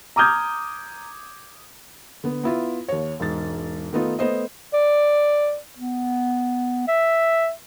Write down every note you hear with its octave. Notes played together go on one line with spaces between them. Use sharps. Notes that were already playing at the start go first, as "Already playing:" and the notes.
A#5 D6 D#6 F6 G6 G#6
D3 B3
B3 E4 F4
D#2 C#5
E1 G#2 A6
D#3 A3 B3 D#4 F4
A3 B3 C5 D#5
D5
B3
E5